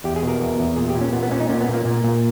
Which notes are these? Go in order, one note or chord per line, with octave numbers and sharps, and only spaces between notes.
E2 G4
G#4
B2
A#4
E2
E2
A#2 G#4
G4
A#2
C#4
A#2 B3
B3
A#2 C#4
D#4
A#2 C#4
B3
A#2
A#3
A#2
A#2